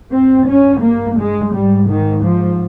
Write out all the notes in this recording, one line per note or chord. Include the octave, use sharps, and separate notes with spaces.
G2 C4
C#4
A#3
G#3
G#2 G3
D#3
F3